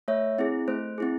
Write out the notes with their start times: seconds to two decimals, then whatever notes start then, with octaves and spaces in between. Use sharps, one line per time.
0.08 A3 C#5 E5
0.38 C4 E4 G#4
0.68 A3 C5
0.98 C4 E4 G#4